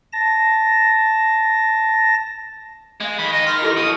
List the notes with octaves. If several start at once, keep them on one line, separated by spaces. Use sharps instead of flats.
A5 A#6
G#3 F5 G#6
D#3 B5
D#5
A#4 C6
E4 G4 A4
B2 F#3 D#6